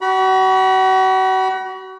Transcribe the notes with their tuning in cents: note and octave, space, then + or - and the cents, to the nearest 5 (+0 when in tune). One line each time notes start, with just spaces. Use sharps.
F#4 +35 B5 -25